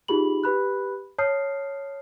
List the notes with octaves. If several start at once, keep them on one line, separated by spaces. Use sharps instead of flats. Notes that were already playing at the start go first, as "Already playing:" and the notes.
D#4 F4 G4 G#4 B5 F#7
G4 B4 B5 F#6
C#5 A5 D#6 F6 G6 C7